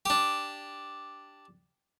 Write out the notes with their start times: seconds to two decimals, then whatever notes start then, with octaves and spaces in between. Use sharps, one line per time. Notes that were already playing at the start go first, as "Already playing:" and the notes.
0.06 D4 G4